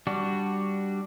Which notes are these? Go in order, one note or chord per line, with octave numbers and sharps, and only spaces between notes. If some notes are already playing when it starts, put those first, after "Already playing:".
G3 D4 F#4